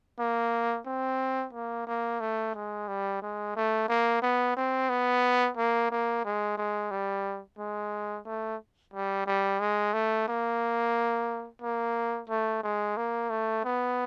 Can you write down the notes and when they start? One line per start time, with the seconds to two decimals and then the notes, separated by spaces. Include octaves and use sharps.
0.20 A#3
0.86 C4
1.53 A#3
1.87 A#3
2.21 A3
2.55 G#3
2.88 G3
3.22 G#3
3.56 A3
3.89 A#3
4.23 B3
4.57 C4
4.90 B3
5.58 A#3
5.91 A#3
6.25 G#3
6.58 G#3
6.91 G3
7.59 G#3
8.26 A3
8.94 G3
9.27 G3
9.60 G#3
9.94 A3
10.28 A#3
11.62 A#3
12.30 A3
12.63 G#3
12.97 A#3
13.30 A3
13.65 B3